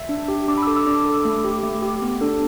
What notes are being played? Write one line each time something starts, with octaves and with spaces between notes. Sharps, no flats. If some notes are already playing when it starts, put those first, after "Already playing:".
Already playing: E5
D4
G4
D4 D6
B5 E6
A4 D6
E6
D4 D6
A4
A3
G4
A3
G4
B3
D4 A4